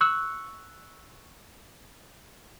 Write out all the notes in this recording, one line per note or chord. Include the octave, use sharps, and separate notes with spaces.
C#6 E6 F#6